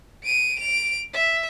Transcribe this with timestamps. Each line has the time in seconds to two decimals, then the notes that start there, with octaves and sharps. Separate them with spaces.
0.23 D7 D#7
0.59 D7 F7
1.14 E5